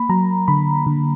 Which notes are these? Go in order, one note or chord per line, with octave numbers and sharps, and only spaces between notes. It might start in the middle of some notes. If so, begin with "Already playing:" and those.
Already playing: A#3 B5
F#3 A#5
D3 B5
D3